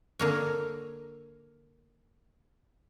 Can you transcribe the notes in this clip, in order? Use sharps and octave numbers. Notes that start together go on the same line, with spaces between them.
D3 A#3 C#5